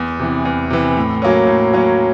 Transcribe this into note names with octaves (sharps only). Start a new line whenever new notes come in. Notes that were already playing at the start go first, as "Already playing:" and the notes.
Already playing: E2
C3 E3
E2
C3 E3
A2
F#3 A#3 C#4
A2
F#3 A#3 C#4